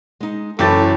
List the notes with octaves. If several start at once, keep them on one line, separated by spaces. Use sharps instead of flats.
G#3 D#4
F#1 E3 F#3 E4 G4 A4 A6